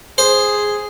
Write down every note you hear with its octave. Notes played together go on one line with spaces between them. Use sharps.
G#4 C5